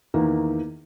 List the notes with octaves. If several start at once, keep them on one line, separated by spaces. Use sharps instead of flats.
E2 D#3 A#3